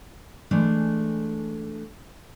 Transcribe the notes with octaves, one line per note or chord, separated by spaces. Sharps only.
E3 G#3 A3 D4